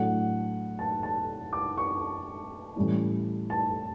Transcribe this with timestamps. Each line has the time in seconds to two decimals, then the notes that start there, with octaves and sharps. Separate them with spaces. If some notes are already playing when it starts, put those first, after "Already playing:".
Already playing: A2 F#3 A3 D4 F#5
0.79 A5
1.03 A5
1.53 D6
1.77 C#6
2.76 A2 E3 G3 C#4 E4
3.50 A5